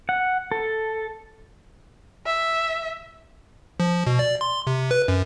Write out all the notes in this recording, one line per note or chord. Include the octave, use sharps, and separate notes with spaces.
F#5
A4
E5
F3
B2
D5
C6
C3
B4
F#2